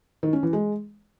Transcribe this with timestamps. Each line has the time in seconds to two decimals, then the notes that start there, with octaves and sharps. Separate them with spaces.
0.23 D#3
0.33 C#4
0.43 E3
0.53 G#3